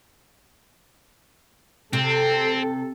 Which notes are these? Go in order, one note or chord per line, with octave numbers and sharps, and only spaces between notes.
C3 C4 A4